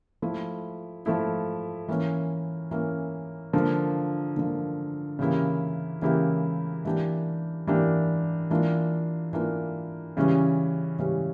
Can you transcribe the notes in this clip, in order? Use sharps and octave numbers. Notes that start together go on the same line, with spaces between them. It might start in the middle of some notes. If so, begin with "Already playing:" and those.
F3 A3 E4
F3 A3 E4
E3 A#3 C#4
E3 A#3 C#4
D3 F3 A#3
D3 F3 A#3
C#3 E3 A#3 E4 G4
C#3 E3 A#3 E4 G4
E3 A#3 D4 G4
E3 A#3 D4 G4
E3 A#3 D4 F4
E3 A#3 D4 F4
C#3 E3 G3 C#4
C#3 E3 G3 C#4